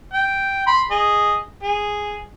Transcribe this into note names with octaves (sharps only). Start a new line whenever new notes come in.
G5
B5 C6
G#4 D#5
G#4